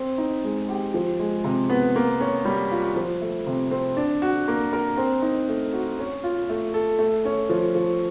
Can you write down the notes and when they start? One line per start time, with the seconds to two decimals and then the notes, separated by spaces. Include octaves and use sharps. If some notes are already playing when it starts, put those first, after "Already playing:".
Already playing: C4
0.18 D#4
0.44 G#3
0.69 G4
0.94 F3
1.20 G#3
1.44 C3
1.70 B3
1.96 A#3
2.20 C#4
2.45 G3
2.71 F4
2.96 F3
3.22 A3
3.47 C3
3.71 C4
3.97 D4
4.22 F#4
4.48 A#3
4.73 A#4
4.97 C4
5.22 D#4
5.48 A3
5.73 F#4
5.99 C#4
6.24 F4
6.49 A3
6.74 A4
6.99 A3
7.25 C#4
7.49 F3
7.75 F3